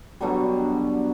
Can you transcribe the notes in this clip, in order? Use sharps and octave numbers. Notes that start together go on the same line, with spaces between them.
B2 D3 F#3 G3